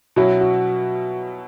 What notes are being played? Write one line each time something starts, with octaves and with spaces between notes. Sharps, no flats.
B2 F#3 C#4 E4 F#4
F#4